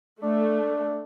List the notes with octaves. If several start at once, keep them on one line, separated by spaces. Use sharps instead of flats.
A3 D4